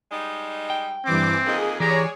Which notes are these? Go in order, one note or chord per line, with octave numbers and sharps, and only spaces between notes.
G3 G#3 D#4
G5
G2 E3 C4 D6
F2 A#3 D#4 G#4
E3 G#3 G4 G#4 C#5 D5 A#5